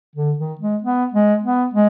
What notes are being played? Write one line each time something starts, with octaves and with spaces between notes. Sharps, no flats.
D3
D#3
G#3
B3
G#3
B3
G#3